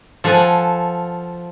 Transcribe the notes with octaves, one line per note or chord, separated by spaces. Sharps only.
F3 A4 F#5 G#5